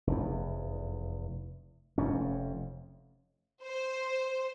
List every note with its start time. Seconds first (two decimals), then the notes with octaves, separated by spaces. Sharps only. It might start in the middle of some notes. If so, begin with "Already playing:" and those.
0.07 F1 E2
1.98 F1 F2 C#4
3.64 C5